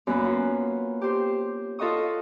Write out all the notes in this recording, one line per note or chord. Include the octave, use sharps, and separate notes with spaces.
F#2 A#3 B3 B4 C#5
F4
G4 C5
F4 A4 D#5 F#5 C#6 D#6